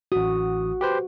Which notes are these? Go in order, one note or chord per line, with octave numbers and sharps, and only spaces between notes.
A1 F#4 D#6
G4 B4 C5